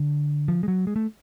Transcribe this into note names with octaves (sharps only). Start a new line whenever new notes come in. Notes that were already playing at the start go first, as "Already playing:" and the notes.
Already playing: D3
F3
G#3
F#3
G#3
A3